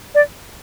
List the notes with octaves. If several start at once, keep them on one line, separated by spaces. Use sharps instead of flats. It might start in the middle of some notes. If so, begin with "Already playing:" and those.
D5